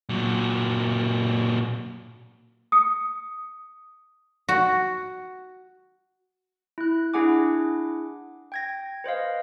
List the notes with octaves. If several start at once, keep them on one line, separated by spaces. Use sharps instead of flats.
A#2 F#3
D#6 C#7
F#4
E4 F#6
D4 E4 G#4 F#5 G#5 D6
G5 G#6 A#6
B4 C5 D#5 F5